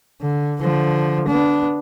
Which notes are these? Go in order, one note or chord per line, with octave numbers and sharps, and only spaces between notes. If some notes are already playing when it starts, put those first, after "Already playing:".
D3
D3 F3
B3 D4